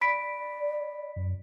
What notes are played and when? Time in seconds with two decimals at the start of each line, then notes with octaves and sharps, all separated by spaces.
0.01 D5 B5 B6 D7
1.16 F#2